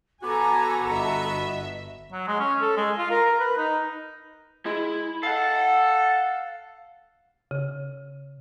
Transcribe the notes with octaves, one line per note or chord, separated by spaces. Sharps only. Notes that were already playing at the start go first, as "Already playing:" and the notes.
B3 F#4 A4 G#5 A#5 D6
G1 D#5 E5
F#3
G#3
C#4
A4
G#3
F4
A#4
A#4
B4
D#4
G#3 E4
A4 F5 F#5
C#3